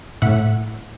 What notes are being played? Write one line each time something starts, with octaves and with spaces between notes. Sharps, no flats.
A2 E5 F#5